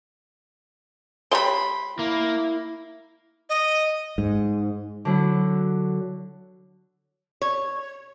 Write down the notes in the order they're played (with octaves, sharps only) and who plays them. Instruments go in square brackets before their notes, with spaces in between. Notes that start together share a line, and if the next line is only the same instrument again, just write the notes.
[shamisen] G3 C#5 [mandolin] B5 C6
[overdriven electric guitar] A#3 [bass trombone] E4
[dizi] D#5
[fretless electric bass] G#2
[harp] D3 F#3 E4
[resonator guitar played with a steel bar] C#5